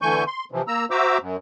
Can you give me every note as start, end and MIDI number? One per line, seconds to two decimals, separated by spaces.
0.02 0.24 50
0.02 0.24 52
0.02 0.24 57
0.02 0.24 80
0.02 0.24 85
0.02 0.24 91
0.27 0.45 84
0.52 0.62 48
0.52 0.62 52
0.52 0.62 53
0.68 0.85 58
0.68 0.85 82
0.68 0.85 88
0.91 1.18 66
0.91 1.18 72
0.91 1.18 76
0.91 1.18 82
0.91 1.18 86
0.91 1.18 88
1.21 1.36 42